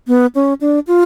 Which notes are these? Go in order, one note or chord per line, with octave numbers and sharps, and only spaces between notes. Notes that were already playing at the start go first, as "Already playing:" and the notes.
B3
C#4
D4
F4